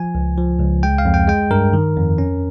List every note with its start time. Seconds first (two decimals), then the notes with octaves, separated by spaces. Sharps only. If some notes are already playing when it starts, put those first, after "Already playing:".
Already playing: F3 G#5
0.15 C#2
0.38 F3
0.60 C#2
0.83 G#3 G5
0.98 F5
1.05 F2
1.14 G5
1.28 G#3 G5
1.51 G2 A#4
1.73 D#3
1.97 F2
2.18 C#4